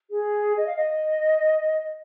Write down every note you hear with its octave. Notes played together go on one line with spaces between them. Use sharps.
G#4
D#5
F5
D#5